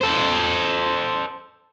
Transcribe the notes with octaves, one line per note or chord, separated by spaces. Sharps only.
A4 C5